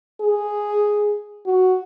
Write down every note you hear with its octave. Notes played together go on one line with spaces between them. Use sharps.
G#4
F#4